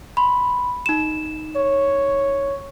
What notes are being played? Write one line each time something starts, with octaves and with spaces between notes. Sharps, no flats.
B5 C6
D#4 E7
C#5